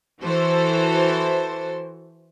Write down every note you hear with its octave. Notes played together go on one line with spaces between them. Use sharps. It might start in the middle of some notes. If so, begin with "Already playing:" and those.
E3 F#4 A4 C5